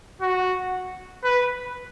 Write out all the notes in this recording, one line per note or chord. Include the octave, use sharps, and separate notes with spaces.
F#4
B4